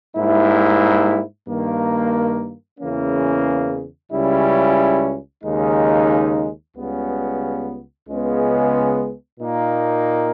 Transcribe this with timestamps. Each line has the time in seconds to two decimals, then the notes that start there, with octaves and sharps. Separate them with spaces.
0.17 G#2 G3 A#3 E4
1.48 G2 D#3 A#3
2.80 E2 C#3 E3 A#3 C#4
4.12 C#2 C#3 G3 C#4 E4
5.44 D#2 C#3 G#3 D#4
6.76 C#2 C#3 G3 B3
8.08 C#2 C#3 G#3 B3
9.39 A#2 A#3 D#4